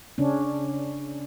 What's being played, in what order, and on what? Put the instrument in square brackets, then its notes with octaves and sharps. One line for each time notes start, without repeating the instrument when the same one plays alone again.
[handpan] C#3 C#4 D4